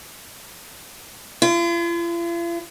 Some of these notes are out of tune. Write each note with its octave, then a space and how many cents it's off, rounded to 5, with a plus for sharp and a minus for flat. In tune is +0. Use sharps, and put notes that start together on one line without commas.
F4 -45